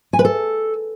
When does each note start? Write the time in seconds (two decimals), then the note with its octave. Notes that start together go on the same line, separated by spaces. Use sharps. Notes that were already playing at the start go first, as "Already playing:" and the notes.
0.13 G#5
0.19 B4
0.25 A4